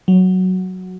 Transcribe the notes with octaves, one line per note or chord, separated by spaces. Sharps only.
F#3